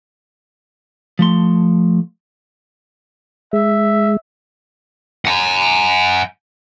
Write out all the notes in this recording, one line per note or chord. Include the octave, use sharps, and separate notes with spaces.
F3 A3 C6
G#3 E5
F#5 G#5